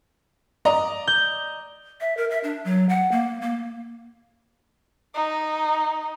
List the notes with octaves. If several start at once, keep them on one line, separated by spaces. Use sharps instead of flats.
D5 D#5 A#5
G6
E5
A#4
E5
D4
F#3
F#5
A#3
A#3
D#4